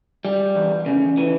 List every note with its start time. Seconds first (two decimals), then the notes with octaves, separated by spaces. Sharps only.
0.25 G3
0.55 E2
0.86 C#3
1.17 E3